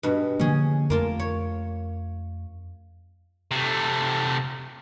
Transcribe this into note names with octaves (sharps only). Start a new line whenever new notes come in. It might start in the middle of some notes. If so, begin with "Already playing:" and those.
G2 B2
D3 F3 A#3 C#4 G#4
F2 A3 A#3 F4 A5
C#5
C3 A3